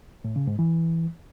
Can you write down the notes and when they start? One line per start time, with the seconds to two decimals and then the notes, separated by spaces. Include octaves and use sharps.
0.24 A2
0.36 C#3
0.47 G#2
0.59 E3